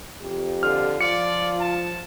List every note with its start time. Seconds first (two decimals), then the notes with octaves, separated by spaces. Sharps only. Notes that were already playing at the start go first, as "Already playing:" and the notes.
0.20 F2 G4
0.63 D3 F4 F6
1.01 F3 F4 D5 C#7
1.60 A5